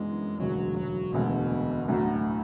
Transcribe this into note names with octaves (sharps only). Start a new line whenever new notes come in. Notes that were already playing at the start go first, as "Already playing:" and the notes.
Already playing: F#2 E3 G#3 B3 D4
E1 D2 D3 F#3 G#3
F#3
E1 D2 B2 D3 G#3
D2 A2 D3 F#3